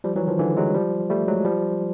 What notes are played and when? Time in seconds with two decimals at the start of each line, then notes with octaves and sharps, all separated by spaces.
0.04 F3 G3
0.16 E3 F#3
0.27 D#3 F3
0.39 D3 E3
0.56 F#3 G#3
0.74 F3 G3
1.10 G3 A3
1.28 F#3 G#3
1.45 F3 G3